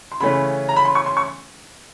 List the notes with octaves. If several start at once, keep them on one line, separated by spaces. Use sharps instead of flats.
C6
C#3 E3 A3 C#4 B5
A#5
B5
C6
C#6
C6
C#6